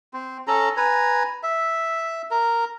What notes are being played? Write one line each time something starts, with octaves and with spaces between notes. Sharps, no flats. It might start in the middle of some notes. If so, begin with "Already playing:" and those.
C4
C#4 A4 A#5
B4 G#5 A#5
E5
A#4